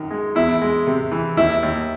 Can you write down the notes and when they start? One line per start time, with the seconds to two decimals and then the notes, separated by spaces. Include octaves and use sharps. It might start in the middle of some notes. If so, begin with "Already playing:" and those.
Already playing: F#2 D#3
0.11 G#3
0.35 E2 E4
0.61 G#3
0.87 C3
1.12 E3
1.37 D#2 E4
1.63 D#2